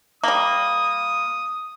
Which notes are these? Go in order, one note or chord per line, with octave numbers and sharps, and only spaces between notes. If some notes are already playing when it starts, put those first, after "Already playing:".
G3 A#3 D#6